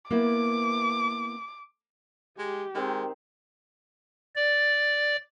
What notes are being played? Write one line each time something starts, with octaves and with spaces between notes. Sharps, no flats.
A#3 B3 E4 D6
G#3 G4
D#3 G#3 C4
D5